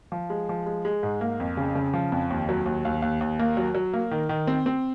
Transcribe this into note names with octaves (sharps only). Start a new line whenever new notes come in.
F3
G#3
F3
G#3
G#3
G#2
A#3
F2
C#3
C#3
F3
F2
D#2
F#3
D#2
D#2
D#2
D#2
A#3
F#3
F#3
A#3
D#3
D#3
C4
C4